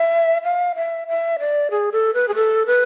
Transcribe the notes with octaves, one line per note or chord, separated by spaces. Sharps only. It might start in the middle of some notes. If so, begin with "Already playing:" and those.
Already playing: E5
F5
E5
E5
D5
G#4
A4
B4
G#4
A4
B4